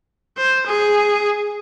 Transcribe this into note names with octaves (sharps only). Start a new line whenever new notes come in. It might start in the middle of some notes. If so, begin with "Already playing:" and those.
C5
G#4